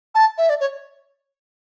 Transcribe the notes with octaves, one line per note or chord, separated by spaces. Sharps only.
A5
E5
D5
C#5